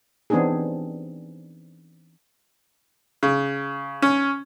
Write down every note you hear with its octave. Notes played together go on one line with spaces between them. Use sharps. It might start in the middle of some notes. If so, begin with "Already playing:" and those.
E3 B3 C4 D4 D#4 G#4
C#3
C#4